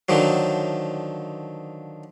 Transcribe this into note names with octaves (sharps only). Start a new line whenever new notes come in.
D3 D#3 F3 F#3